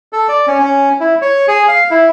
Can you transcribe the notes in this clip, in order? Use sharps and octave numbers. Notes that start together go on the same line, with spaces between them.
A4
D5
C#4
C#4
E4
C#5
G#4
F5
E4